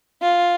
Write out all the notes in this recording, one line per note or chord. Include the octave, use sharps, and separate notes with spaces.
F4